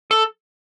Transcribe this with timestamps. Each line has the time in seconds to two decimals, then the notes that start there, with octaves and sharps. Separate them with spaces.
0.11 A4